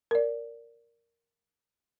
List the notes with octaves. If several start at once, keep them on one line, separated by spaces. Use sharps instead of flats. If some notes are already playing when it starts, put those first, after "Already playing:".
A#4 D5